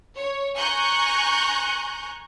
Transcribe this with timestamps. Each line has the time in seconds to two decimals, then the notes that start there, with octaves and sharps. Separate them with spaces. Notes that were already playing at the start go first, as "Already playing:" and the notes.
0.16 C#5
0.56 G#5 A#5 C#6 F#6 G6